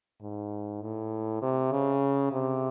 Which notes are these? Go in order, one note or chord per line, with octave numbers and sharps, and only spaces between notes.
G#2
A2
C3
C#3
C3